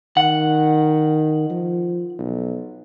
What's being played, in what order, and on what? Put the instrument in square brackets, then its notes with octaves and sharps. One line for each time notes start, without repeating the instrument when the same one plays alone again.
[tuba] D#3 [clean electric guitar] F#5
[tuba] F3
B1